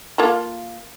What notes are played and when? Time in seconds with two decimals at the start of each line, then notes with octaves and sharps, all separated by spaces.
0.18 A#3 F4 A4